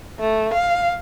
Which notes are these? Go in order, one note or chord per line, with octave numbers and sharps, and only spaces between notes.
A3
F5